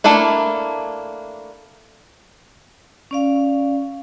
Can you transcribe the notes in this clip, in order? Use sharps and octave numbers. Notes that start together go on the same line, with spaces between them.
A3 A#3 D4 E4
C#4 D5 F5